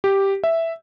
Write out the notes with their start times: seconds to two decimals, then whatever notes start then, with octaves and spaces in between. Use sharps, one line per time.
0.04 G4
0.44 E5